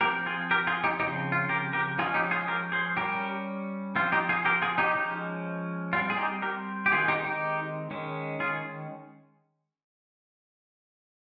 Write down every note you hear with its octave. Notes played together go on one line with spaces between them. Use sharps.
F3 C4 G4 A#4
F4 G#4
G4 A#4
F4 G#4
D#4 G4
C#3 F3 C4 D#4 G4
F4
G4 A#4
G4 A#4
F3 G#3 C#4 F4 G#4
D#4 G4
F4 G#4
G4 A#4
G#4 C5
G3 C#4 G4 A#4
F3 C4 F4
D#4 G4
F4 G#4
G4 A#4
F4 G#4
D#4 G4
F3 G#3 C#4
G3 C4 F4
G#4
D#4 G4
G4 A#4
G4
D#3 G#3 C4 F4 G#4
D#4 G4
D#4 G4
D#3 G#3 C#4
F4 G#4